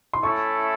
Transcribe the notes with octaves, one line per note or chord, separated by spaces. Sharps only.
C6
A3 C#4 E4 A4 C#6